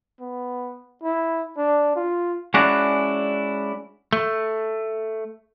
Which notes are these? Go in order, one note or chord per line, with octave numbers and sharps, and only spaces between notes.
B3
E4
D4
F4
G#3 C#4 D4 E4 F#4
A3